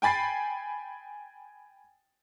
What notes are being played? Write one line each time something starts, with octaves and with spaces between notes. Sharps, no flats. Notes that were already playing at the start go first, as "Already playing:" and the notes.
G5 G#5 B5 A6 C7